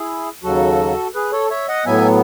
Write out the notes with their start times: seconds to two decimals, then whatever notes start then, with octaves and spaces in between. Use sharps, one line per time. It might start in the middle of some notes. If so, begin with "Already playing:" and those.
Already playing: E4 G#4
0.43 D#2 C#3 F#3 F#4 A4
1.14 G#4 B4
1.32 A4 C#5
1.50 C#5 E5
1.68 D#5 F#5
1.86 A2 F#3 B3 E5 G#5